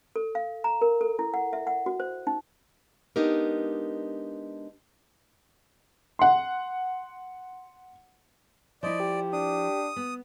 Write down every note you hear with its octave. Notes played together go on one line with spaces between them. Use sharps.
A4
F5
A#5
A#4
A4
E4
F#5
E5
F#5
F#4
C5
D#4
G#3 B3 D4 D#4 G4 A#4
F#5 C6
F3 E4 D5 D#5
G4
D4 D#6
B3